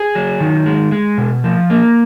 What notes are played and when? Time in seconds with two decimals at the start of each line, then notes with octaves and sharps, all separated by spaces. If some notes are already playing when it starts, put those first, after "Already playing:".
Already playing: G#4
0.15 F#3
0.40 D#3
0.66 G#3
0.92 G#3
1.18 B2
1.44 F3
1.70 A#3